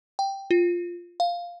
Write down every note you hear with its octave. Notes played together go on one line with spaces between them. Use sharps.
G5
F4
F5